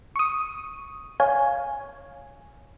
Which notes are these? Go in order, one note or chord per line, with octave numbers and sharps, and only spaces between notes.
C#6 D#6
C#5 F5 G#5